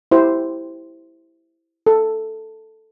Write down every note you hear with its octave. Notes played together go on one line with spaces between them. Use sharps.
E4 G4 C5
A4